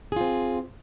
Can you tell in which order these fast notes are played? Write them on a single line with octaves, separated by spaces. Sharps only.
G#4 F4 C4